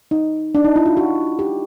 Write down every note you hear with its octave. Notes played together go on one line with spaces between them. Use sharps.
D#4
D4
D#4
E4
F4
F#4
G4